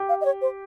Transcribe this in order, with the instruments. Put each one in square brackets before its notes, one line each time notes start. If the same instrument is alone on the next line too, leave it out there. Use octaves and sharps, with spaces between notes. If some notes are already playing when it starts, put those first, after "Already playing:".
Already playing: [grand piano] G4
[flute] F5
D#5
C#5
C5